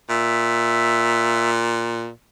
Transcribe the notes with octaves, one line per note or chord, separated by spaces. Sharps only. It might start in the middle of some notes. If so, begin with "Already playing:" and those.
A#2 E5